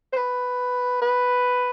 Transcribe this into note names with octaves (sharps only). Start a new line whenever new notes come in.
C5
B4
B4